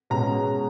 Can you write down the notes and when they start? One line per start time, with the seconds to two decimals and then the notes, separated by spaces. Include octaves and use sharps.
0.10 B2 G#3 C#4 A#5